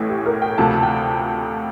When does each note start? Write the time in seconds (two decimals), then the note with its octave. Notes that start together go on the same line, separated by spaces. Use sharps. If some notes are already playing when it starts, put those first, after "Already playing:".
Already playing: A1 A2 E3
0.09 G4
0.26 A#4
0.42 G5
0.58 D2 C3 F3 A5
0.83 G5